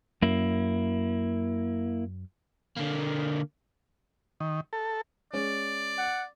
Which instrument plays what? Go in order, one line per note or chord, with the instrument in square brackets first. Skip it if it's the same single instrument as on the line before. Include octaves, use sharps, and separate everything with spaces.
[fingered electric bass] F#2 [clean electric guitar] A#3 E4
[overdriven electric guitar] D3 A#3
[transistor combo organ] D#3
A4
[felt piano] G#3 C#4 [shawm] D5
[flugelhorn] F#5